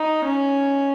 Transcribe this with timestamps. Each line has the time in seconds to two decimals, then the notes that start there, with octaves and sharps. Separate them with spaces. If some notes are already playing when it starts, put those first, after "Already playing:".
Already playing: D#4
0.25 C#4